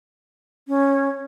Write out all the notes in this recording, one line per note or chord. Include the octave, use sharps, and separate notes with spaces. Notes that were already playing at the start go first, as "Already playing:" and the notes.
C#4